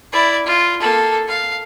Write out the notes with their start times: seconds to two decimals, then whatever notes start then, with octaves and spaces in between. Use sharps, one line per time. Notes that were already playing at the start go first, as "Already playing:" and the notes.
0.13 E4 D5
0.46 F4
0.81 A#3 A4
1.28 F5